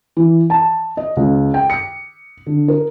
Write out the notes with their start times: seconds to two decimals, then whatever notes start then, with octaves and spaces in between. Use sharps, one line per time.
0.17 E3
0.50 A5
0.97 D#5
1.17 C#2
1.54 G5
1.70 C#7
2.46 D3
2.68 A#4